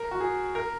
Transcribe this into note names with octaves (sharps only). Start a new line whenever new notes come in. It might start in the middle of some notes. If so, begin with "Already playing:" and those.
Already playing: A#4
F#4
G#4
A#4